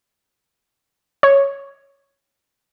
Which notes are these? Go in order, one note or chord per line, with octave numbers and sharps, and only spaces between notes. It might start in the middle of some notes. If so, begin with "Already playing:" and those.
C#5